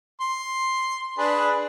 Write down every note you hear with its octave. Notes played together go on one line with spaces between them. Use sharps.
C6
D4 G#4 B4